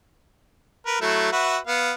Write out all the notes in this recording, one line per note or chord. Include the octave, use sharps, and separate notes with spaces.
A#4 B4
F#3 A3 E4
F#4 B4 E5
B3 F5